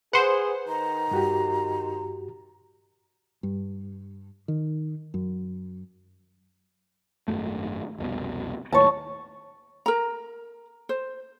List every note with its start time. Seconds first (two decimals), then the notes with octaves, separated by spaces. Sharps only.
0.13 G#4 B4 C5 F#5
0.68 D#3 A#5
1.11 G2 F#4 G4
3.43 G2
4.48 D#3
5.14 F#2
7.28 G#1 F#2 A3
7.98 F1 C2 B2
8.72 D#2 A2 C#5 A5
9.86 A#4 A#5
10.89 C5